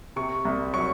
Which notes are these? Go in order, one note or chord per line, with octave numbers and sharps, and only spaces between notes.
C3 C#6
C2
F#3 C#6